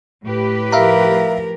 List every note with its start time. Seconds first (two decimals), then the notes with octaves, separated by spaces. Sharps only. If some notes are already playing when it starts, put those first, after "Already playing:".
0.24 A2 G4 B4
0.72 F3 A#4 E5 F5 A#5